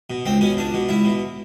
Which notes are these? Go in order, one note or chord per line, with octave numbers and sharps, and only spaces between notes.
B2
C#2 C4
B2 C#4
C#2 D4
B2
C#2 E4
B2